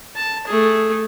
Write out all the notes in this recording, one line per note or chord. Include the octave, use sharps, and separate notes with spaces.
A5
A3 G#4